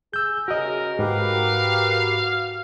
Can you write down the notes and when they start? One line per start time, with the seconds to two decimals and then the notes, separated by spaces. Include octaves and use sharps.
0.14 G#4 E6 G6
0.48 C#3 F#4 A#4 D#5
0.99 G#2 F#4 G4 A#4 B4 F5